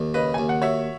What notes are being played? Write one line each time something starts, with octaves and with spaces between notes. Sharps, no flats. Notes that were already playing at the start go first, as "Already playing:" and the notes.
Already playing: D#2
C#3 B4 D#5
D#2 G#5
F#5
F#4 C#5 E5